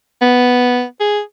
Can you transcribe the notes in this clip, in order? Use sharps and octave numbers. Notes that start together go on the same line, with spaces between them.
B3
G#4